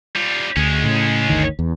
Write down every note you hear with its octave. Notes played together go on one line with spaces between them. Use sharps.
G3 F4
D2 G#3 C#4
A2 C#3
G1 D2 D#3
E2